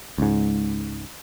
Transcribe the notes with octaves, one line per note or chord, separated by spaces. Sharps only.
C#2 G#2